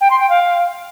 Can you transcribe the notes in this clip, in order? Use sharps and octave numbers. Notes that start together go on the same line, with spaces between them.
G5
C6
G5
F5